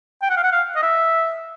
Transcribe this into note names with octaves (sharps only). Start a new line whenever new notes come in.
G5
F#5
F5
F#5
F5
D#5
E5